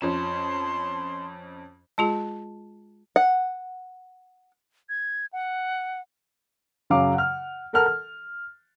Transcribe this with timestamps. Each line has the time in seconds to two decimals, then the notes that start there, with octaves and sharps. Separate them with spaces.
0.01 F2 C#4 A5 C6 E7
1.98 G#3 F4 G#4 A5
3.16 F#5
4.89 G#6
5.33 F#5
6.90 F#2 C#3 F#3 F5 D6
7.14 F#5 F6
7.73 A4 A#4 F#5 A5 F6
7.86 F6